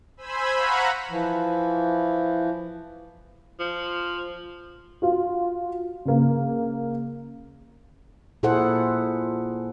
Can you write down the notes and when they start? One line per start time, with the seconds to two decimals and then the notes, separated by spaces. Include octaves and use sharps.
0.17 C5 G#5 B5 E6
0.55 F5 F#5 A#5 B5 C#6 F#6
1.09 E3 F3
3.60 F3
5.02 F4 F#4
6.05 C#3 A#3
8.43 A#2 E4 G#4 A4 C5 F#5